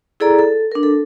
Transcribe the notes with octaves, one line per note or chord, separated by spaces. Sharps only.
E4 G#4 A4 D5 A#5
A4
D4 A#4
A4